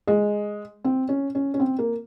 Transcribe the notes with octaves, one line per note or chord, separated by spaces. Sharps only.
G#3
C4
C#4
C#4
C#4
C4
A#3